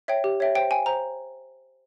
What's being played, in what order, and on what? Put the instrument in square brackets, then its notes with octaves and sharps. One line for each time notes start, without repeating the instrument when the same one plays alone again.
[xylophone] C#5 E5 G5
G4
C#5 E5 G5
C5 G5
G5 G#5
C5 A#5